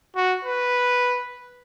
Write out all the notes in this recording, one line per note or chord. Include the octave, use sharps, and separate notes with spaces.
F#4
B4